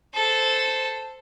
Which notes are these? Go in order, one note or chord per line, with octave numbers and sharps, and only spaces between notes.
A4 C5